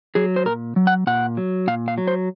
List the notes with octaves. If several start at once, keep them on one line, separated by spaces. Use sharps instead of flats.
F#3 G#4
C5
A#2 A#4
F#3
F#5
A#2 F#5
F#3
A#2 F5
F5
F#3
C5